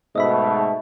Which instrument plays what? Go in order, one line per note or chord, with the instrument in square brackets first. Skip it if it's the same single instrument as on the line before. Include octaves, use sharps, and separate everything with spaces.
[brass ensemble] G#2 B2 A3 [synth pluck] D#5 E5 B5